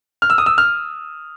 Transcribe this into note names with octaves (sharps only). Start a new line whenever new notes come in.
F6
E6
D#6
E6
F6